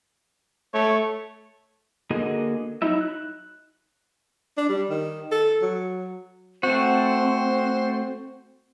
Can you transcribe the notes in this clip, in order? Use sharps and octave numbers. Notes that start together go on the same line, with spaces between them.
A3 C#5
D3 A#3 F#4 G#4 D#5
F#3 D#4 E4 E5
F#6
D4
G3
D#3
A4
F#3
A3 C4 F#4 C5